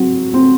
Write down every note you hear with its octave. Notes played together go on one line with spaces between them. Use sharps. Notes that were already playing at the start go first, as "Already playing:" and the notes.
Already playing: F#3 C4
C4